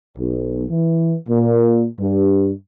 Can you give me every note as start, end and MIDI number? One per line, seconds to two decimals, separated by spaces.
0.18 0.64 35
0.70 1.16 52
1.28 1.86 46
1.99 2.52 43